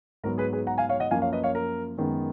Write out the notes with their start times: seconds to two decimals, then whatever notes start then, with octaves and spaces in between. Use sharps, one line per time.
0.23 G#2 F#3 B3 A#4
0.38 G#4 B4
0.53 G#4 B4
0.67 F#5 A#5
0.78 F5 G#5
0.89 C#5 F5
1.00 D#5 F#5
1.11 F#2 F3 A#3 F5 G#5
1.22 C#5 F5
1.32 B4 D#5
1.43 C#5 F5
1.55 A#4
1.97 F#2 D#3 G#3 B3